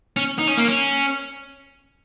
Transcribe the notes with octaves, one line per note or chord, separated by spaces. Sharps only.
C#4
D#4
C#4
A#3
C#4